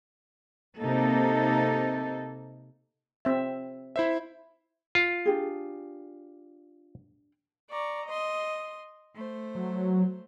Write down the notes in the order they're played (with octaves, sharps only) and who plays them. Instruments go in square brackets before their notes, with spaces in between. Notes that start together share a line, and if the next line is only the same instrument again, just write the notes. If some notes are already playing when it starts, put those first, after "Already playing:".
[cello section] C3 A#3 D#4 A4
[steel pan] C4 E5
[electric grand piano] E4 C5 E5
[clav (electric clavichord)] F4
[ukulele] D4 G4 G#4
[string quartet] D5 A#5 C#6
D#5 C6
A3 C5
[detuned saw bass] F#3